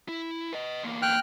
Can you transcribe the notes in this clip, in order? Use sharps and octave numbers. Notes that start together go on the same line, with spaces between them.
E4
B4 D#5
E2 A#3
G5 F6 F#6